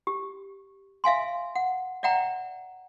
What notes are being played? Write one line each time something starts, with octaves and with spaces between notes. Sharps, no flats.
G4
E5 F5 G#5 C6
F#5
D5 E5 F#5 G5 A#5